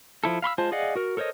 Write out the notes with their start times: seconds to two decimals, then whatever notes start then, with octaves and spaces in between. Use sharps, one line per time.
0.24 F3 E4 A4
0.42 F5 B5 C6 E6
0.58 G#3 F4 C5 A5
0.72 G#4 D5 D#5 F5 F#5
0.96 F#4 A#4
1.17 A4 A#4 C5 C#5 D#5